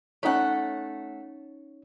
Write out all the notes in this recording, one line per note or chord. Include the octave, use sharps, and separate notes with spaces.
A3 C#4 D#4 C#5 F#5